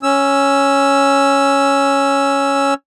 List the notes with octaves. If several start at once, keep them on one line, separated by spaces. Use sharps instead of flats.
C#4 E6